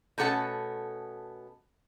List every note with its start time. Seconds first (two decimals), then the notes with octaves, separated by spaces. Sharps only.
0.18 B2 A3 C#4 A4 F#5 A5